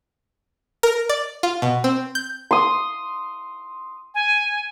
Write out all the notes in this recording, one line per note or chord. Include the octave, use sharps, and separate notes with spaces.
A#4
D5
F4
B2
C4
G6
C6 D#6
G#5